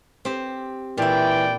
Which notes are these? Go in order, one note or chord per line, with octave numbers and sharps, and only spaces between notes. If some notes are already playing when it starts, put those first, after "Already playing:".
C4 G4
A#2 E3 E4 D5 G5